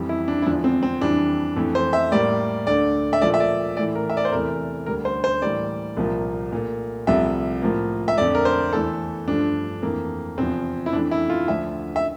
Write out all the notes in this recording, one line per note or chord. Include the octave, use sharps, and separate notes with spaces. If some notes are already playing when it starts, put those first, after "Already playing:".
Already playing: F2 E3 G3
E4
D4
E4
E2 D3 F3 D4
C4
C4
F2 E3 G3 D4
F2 E3 A3
C5
E5
A2 G3 A#3 D5
D2 D3 A3 D5
E5
A#2 F3 A3 D5
E5
D5
A2 E3 A3 D5
A#4
E5
D5
C5
E2 C3 E3 A3 A#4
D2 D3 G3 A#4
C5
C5
A2 E3 G3 A#3 D5
C2 A#2 F3 A#3
A#2 A3
C2 C3 F3 A3 E5
A2 F3 A#3
E5
F2 D3 A3 D5
A#4
C5
E2 E3 A3 A4
G2 F3 A3 D4
F2 E3 A3 A#3
E2 C3 F3 C4
E4
F2 E3 A3 D4
E4
F4
D2 D3 F3 E5
E5